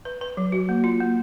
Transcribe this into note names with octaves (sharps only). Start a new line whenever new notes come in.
B4
B4
F#3
F#4
A#3
F4
A#3